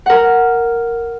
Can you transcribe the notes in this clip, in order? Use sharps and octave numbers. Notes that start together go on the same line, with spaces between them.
A#4 F#5